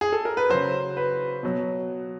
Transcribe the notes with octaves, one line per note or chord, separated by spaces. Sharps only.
G#4
A4
A#4
B4
C#3 F#3 C5
B4
B2 F#3